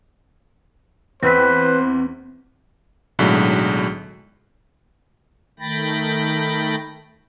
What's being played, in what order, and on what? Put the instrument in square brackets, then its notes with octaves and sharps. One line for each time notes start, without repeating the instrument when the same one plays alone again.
[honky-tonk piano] E2 B6 [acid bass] C4 [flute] B4 [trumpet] C5
[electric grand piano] B1 A2 D3 F#3 G#3
[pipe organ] D#3 A3 G5 B5 A6 A#6